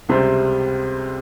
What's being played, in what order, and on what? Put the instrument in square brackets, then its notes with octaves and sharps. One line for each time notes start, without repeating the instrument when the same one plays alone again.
[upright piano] C#2 C3 G3 C4